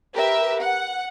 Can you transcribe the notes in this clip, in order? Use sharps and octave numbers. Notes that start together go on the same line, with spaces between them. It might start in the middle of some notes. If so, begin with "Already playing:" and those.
G4 A#4 B4 E5
F#5